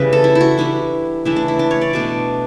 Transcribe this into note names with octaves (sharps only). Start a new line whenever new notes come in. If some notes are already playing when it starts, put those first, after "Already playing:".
Already playing: C#3 E3 G3 C#4 B4
A4
E4
E4
F#4
E3 G3 D4 E4
C#3 E3 A3 D4 E4
D4
E4
D4
C#5
D5
B2 A3 D4